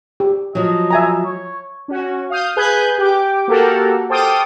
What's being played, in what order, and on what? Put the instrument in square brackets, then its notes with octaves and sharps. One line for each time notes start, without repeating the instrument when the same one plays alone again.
[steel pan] G4
[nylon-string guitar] F3 F#3 [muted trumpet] D#5
[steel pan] E5 G#5 A#5
[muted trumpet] C#5
[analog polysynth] C#4 F#4
F5 D#6 G6
G#4 B4 G#5 F#6 G6
G4 G5 D6
A#3 F#4 G4 A4 A#4 F#5
A4 C5 G5 D6 D#6 F6